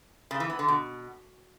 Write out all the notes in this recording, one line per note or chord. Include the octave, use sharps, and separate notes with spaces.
C#3
E3
B3
D3
B2